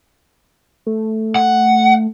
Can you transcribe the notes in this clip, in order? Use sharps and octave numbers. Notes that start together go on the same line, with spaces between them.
A3
F#5